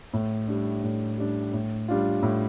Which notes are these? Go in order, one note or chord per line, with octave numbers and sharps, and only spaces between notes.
A2
G3 D4
A2
G3 D4
A2
G3 D4 F4
A2